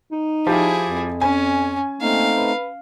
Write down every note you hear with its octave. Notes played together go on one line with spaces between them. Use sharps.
D#4
F3 E4 G4 G#4
F2
C#4 G#5
A3 A#3 C4 D#4 F5
B4